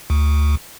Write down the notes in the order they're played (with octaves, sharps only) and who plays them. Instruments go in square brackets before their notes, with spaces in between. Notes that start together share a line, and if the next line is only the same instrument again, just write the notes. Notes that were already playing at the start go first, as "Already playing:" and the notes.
[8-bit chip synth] D2